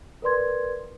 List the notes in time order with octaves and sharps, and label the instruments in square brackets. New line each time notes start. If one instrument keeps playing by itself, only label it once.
[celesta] A#4 B4 D5 C6 G#6